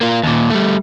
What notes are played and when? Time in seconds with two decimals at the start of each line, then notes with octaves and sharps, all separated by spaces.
0.01 A#3 F4
0.23 D#2 A#2
0.50 G3 A3